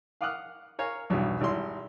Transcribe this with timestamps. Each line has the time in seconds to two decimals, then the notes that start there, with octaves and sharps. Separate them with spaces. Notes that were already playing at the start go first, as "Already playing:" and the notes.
0.21 F5 F#5 D6 D#6 F6 F#6
0.79 A#4 C#5 F5 G#5
1.10 B1 E2 G2 B2
1.41 G#1 G3 E4 C6